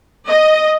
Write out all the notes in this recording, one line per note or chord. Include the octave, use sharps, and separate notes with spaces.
D#5